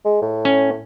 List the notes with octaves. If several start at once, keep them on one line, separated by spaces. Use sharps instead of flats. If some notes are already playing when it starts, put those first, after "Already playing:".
G#3
A2
C#4